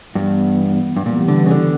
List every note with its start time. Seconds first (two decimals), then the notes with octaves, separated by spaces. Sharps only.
0.15 G2 E3 B3
0.97 G2
1.06 A#2 E3 G3 B3
1.28 D3
1.46 C#3
1.51 D3